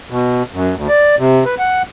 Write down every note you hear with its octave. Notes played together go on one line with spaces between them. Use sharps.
B2
F#2
D2
D5
C3
B4
F#5